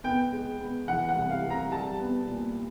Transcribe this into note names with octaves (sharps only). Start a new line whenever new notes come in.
B3 G5
G#3
B3
E3 F#5
F#5
C2
F5
C2
A#5
G3 A5
B3
A#2